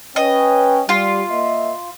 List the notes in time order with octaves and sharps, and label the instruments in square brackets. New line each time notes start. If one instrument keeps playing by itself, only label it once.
[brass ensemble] C#4 B4 G5 [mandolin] D#5
[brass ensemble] G3 [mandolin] F4
[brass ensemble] A#3 D#5 E5